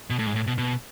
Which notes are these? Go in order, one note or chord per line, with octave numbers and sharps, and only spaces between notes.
B2
A2
G#2
A2
B2
B2